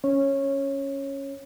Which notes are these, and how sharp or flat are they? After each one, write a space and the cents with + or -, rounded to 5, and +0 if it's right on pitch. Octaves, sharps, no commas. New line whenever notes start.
C#4 +0 C#5 -15